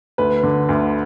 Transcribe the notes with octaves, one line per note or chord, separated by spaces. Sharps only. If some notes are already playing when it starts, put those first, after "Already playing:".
D2 B4
D3
D2